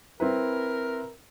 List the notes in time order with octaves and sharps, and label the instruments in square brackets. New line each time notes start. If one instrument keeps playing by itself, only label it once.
[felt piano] C4 E4 B4 [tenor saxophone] A#4